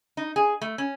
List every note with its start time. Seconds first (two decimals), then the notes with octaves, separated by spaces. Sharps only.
0.17 D#4
0.36 G#4
0.61 A3
0.78 C#4